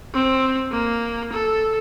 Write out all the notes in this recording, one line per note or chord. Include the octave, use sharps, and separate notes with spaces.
C4
A#3
A4